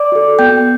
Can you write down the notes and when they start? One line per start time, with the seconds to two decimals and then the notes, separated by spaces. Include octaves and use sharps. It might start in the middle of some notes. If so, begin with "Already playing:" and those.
Already playing: D5 D6
0.12 F#4 A4
0.39 B3 G5 G6